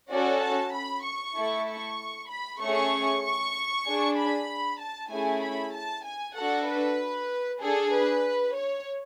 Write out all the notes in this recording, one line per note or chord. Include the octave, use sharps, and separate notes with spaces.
C#4 F#4 A4 D5
A5
B5
C#6
A3 E4 A4
C#6
B5
A3 C#4 G#4 C#6
C#6
D4 G#4
B5
A5
A3 C#4 E4 G#4 G#5
B5
A5
G#5
D4 F#4 A4 F#5
B4
D4 G#4 A4
B4
C#5